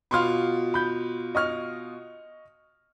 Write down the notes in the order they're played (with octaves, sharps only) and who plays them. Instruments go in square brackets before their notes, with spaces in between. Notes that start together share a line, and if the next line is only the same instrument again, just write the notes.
[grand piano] B2 F4 [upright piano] B5 C6 F6
[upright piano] B5 G6
D#5 C#6 F6